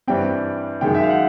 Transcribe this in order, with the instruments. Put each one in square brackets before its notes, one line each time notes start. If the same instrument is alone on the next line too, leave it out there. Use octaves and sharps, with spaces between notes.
[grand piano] G2 E3 G3 C4 G5
F#2 D#3 G#3 G5
E5
F5
F#5